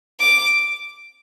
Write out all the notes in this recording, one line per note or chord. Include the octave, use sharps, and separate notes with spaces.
D6